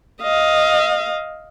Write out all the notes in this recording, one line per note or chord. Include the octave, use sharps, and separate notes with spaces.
D#5 F5